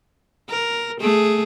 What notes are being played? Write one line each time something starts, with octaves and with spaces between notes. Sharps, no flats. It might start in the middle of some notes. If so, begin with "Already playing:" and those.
A#4
A3 G#4